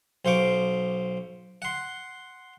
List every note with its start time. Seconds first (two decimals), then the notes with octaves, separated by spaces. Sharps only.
0.25 B1 C5 F5 C#6 D6
1.62 F#5 C6